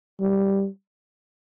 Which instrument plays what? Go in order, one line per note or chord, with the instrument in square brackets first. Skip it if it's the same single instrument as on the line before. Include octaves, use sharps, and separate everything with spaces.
[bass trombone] G3